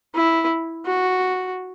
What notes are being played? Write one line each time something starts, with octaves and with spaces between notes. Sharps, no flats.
E4
F#4